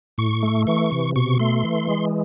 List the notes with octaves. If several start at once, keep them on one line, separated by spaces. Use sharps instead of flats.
A2 C#6
A3
E3 C#6
C3
B2 C#6
A3 C6
E3
G#3